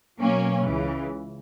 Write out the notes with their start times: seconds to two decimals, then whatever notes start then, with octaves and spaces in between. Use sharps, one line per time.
0.18 B2 F#3 A#3 C#4
0.65 C#2 C#3 E3